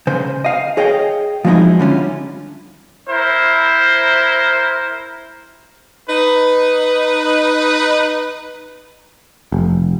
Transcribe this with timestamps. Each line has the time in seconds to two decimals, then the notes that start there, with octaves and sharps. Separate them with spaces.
0.07 C#3 C5
0.44 D#5 F5
0.77 G#4 C#5 D#5 F5 G5
1.45 F3 F#3 G#3 C4 D#4 E4
1.79 D3 G3 C#4 F4
3.08 E4 A#4 C5
6.08 D#4 B4
9.52 F1